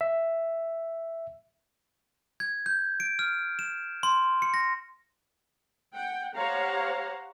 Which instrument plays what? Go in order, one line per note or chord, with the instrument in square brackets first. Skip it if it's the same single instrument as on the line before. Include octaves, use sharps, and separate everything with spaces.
[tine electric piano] E5
[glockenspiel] G#6
G6
D7
F6
E7
C6
C#7
A#6
[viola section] F#5 G5
G4 C5 C#5 F5 F#5 A#5